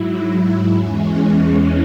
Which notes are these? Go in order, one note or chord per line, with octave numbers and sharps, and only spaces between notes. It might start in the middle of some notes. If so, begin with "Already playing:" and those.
Already playing: G#2 F#3 E4
E2 E3 G#3 C#4